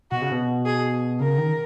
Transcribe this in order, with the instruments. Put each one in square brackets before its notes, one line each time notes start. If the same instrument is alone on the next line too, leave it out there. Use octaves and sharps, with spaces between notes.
[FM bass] B2 [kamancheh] F#4
[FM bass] C#3
B2
[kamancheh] G#4
[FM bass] C#3 [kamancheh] A#4
[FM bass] D#3